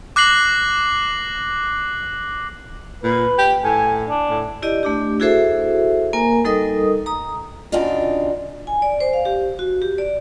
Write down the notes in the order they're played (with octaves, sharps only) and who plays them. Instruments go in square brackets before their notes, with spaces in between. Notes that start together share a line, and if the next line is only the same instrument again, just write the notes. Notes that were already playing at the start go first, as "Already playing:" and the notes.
[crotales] D6 F#6 A#6 C7 F#7
[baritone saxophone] A#2 [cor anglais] B4
[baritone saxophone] G4
[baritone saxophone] A2 [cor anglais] G#5
[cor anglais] D4
[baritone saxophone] A2
[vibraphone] E4 G4 D5 D#5
A3 D4 G4
E4 F#4 G#4 A4 C5 E5
A#3 A#4 G#5
G3 D#4 A4 A#4 D#5 D#6
A#5 D#6
[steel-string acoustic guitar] F#2 C#3 D4 D#4 F4
[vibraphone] G#5
D5
C5
F5
G4
F#4
G4
D5